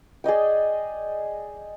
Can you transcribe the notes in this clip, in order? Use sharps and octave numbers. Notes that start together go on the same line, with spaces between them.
G#4 D5 D#5 G5